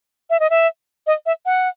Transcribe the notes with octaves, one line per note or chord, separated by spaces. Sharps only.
E5
D#5
E5
D#5
E5
F#5